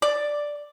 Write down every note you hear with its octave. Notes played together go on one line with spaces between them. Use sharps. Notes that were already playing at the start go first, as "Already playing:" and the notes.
D5